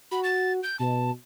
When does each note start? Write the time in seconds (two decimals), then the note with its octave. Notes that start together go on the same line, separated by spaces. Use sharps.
0.11 F#4 B5
0.24 A6
0.63 G6
0.79 B2 A5